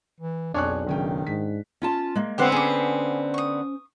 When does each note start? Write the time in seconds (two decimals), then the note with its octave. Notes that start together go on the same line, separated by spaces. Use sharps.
0.20 E3
0.54 B1 F2 D4 G#4 C#5 C#6 F#6
0.87 F#1 D#3 C#4 G5
1.27 G#2 B6
1.82 C#4 F4 A5
2.15 G#3 A#3
2.38 D3 B3 C4 G4 C5 F#5
2.52 C#4 G#4 C5 D6
3.34 C#6 D#6